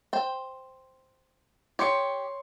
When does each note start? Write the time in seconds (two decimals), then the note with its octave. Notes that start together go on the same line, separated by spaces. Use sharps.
0.13 C5 G5
1.79 G4 C#5 C6 C#7